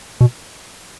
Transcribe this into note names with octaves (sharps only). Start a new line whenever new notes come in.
B2